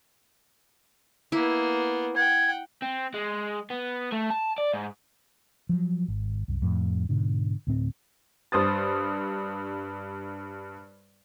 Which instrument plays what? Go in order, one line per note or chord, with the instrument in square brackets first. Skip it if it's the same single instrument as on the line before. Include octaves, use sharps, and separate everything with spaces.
[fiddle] A#3 B3 [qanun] E4
[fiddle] F#5 G5 [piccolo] G#6
[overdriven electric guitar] C4
G#3
B3
A3
A5
D5
G#2
[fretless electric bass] F3 F#3
G#1
C2 F#2
F2 A2
G#2 B2 D3
D2 A2 C4
[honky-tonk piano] G2 C5 D#6 A6